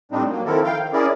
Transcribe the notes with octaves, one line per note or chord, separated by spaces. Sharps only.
A2 G3 C4 D4 D#4
F#3 A#3
D#3 F3 C4 E4 A4 A#4
F5 G5
D#3
C#4 E4 G#4 A#4 D5